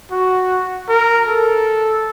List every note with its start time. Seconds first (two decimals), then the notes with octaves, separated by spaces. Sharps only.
0.11 F#4
0.89 A#4
1.27 A4